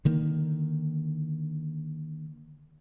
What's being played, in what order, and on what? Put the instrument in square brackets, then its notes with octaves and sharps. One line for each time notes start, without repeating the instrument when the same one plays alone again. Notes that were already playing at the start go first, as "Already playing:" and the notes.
[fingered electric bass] D3 D#3 A#3